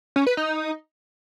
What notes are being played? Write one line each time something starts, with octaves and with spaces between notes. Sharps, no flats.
C#4
B4
D#4